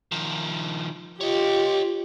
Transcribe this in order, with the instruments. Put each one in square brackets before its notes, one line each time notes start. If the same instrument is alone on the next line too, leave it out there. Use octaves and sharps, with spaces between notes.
[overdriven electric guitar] D#3 F3
[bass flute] F4 [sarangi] G4 [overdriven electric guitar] C#5 D#5